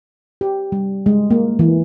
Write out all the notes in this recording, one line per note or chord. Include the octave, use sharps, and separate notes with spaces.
G4
G3
G#3
A#3
E3